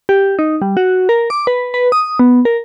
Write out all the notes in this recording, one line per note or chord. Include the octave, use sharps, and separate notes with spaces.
G4
D#4
G3
F#4
A#4
D6
B4
B4
D#6
B3
A#4